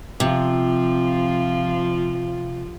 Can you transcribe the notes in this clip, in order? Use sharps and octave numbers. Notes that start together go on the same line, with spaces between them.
C3 F3 F4